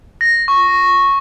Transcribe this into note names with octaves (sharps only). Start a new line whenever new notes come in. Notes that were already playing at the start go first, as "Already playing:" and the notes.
A#6
C#6